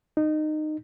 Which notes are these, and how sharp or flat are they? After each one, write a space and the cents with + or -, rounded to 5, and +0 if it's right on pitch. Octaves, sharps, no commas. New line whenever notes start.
D#4 -20